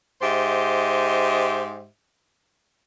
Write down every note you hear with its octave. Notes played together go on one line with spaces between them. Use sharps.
G#2 G4 C5 D#5 E5